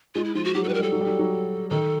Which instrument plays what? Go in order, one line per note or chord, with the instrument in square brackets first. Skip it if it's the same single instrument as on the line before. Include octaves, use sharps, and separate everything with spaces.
[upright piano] G#3 [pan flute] F4
[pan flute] E4
[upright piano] F3 [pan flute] F4
[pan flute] F#4
[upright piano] F#3 [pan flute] G4
[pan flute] A4
[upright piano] G3 [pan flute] B4
[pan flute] A#4
[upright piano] G3
[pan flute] A4
[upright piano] F#3
G3
F#3
F#3
[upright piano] D#3 [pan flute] A4